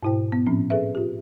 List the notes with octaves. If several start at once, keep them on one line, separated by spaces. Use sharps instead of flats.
G#2 B2 E4 C5 G5
B3
A2 F3 C4 C#4
G#4 A4 B4 E5
F4 G4